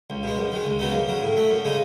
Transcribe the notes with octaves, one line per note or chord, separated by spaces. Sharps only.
C#2
B2 G#3
F#2
D#3 G#3
C#2
C#3 F#3 B3 D#4
F#2
C#3 F#3
A2
F#3 A3
F#2
C#3 G#3 D#4